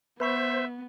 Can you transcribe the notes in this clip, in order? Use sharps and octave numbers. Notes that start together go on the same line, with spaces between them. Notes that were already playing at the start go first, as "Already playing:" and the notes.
B3 B4 C5 E5 B5 C#6